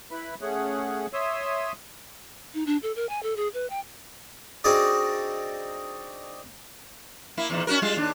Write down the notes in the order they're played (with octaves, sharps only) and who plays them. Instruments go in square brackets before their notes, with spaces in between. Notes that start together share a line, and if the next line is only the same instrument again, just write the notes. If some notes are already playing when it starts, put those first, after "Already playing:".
[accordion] E4 B4 B5
A3 C#4 G#4 F#5
C#5 E5 C6 D#6 E6
[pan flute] D#4
D4
A4
A#4
G#5
A4
G#4
B4
G5
[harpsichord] C4 D4 D#4 F#4 G#4 D5
[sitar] A#3 E4
E2 A#2 D#3
C#4 F#4 A#4
G3 G#3 F4
D#2 D4